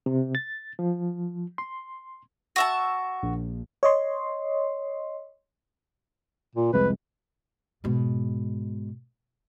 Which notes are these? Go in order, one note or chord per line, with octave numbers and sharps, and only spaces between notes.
C3
A6
F3
C6
F#4 E5 A5
A#1
C#5 D#5 C6
A#2
C2 F2 G#3 B4
G#2 B2